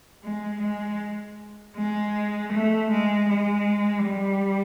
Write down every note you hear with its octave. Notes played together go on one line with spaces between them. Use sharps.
G#3
G#3
G#3
A3
G#3
G#3
G3